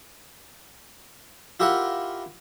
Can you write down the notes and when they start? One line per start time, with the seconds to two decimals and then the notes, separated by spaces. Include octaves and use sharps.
1.60 E4 F4 G4 A#4 E5 F#5